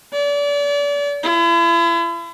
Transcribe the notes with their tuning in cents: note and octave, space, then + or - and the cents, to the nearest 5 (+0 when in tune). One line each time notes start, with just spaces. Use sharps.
D5 -35
E4 +40